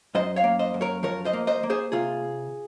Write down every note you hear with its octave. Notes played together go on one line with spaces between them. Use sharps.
F#2 C5 D#5
C#5 F5
A#3
C5 D#5
F#2
A#4 C#5
F3 A#4 C#5
C5 D#5
A#3
C5 D#5
A#3
G#4 C5
C3 F4 G#4